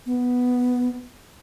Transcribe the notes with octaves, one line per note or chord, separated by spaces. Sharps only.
B3